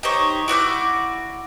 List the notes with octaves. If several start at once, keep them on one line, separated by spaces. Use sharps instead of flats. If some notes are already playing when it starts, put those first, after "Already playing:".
D#4 G4 C5 C#5
E4 F#4 D5 G6